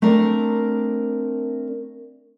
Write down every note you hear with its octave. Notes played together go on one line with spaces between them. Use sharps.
A3 C4 D4 A#4 D5